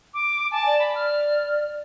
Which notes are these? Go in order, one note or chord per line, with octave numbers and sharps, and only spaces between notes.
D6
G#5 A5
D5
B5
F6